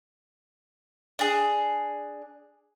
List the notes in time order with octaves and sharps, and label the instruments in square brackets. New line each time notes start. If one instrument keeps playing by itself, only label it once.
[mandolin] D4 G#4